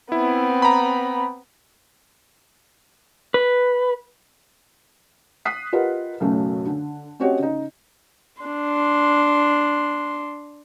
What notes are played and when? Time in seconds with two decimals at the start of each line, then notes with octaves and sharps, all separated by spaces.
0.12 B3 C4 E4
0.62 A#5 B5
3.34 B4
5.45 D#6 F#6 B6 C7
5.73 F4 G4 A#4 B4 D#5 F#5
6.20 B1 F#2 C#3 A3
6.66 D3
7.20 C4 C#4 F#4 G4 C#5 D#5
7.39 C#3 D#4
8.42 D4 C6